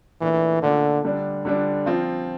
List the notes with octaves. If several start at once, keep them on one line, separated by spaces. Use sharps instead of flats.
A#2 E3 A3 D4
A#2 D3 A3 D4
D3 G3 D4
D3 G3 D4
F3 C4 F4